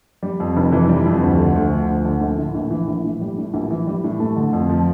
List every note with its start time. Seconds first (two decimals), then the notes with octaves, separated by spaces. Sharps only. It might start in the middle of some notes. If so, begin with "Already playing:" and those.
0.23 G3
0.40 F2
0.56 F1
0.73 E3
0.89 G3
1.06 F2
1.22 D2
1.39 D3
1.56 D2
1.73 F3
1.88 D2
2.05 D3
2.21 A#1
2.38 A2
2.55 A#1
2.71 E3
2.88 A#1
3.04 A2
3.21 G3
3.38 A2
3.54 A#1
3.71 E3
3.87 G3
4.04 A2
4.20 A3
4.36 D3
4.53 F2
4.69 F3